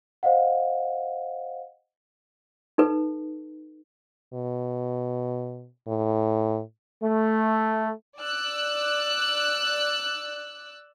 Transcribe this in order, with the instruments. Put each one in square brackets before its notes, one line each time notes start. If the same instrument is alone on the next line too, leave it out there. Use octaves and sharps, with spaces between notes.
[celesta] C5 D#5 F5 F#5
[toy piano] D#4 A4 B4
[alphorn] B2
A2
[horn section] A3
[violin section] D5 E6 F#6